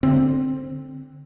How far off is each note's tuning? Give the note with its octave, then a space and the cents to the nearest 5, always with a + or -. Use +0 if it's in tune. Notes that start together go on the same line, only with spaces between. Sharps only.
D3 +0 C4 +0